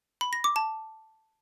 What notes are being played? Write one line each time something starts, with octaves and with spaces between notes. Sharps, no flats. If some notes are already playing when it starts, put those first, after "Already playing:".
B5
A#6
D6
A5